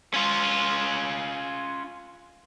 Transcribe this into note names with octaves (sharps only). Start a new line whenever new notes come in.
C#4 F4